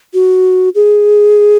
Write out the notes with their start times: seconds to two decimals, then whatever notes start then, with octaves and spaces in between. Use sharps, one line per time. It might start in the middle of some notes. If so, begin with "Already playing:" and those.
0.14 F#4
0.75 G#4